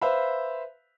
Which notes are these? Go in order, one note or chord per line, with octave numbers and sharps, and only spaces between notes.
B4 C5 E5 F5 B5